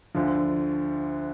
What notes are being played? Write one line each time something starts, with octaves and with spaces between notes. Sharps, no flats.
D2 D3 F3